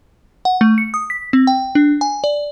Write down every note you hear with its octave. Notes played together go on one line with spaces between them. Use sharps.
F#5
A3
C#7
D#6
B6
C4
G5
D4
G#5
D5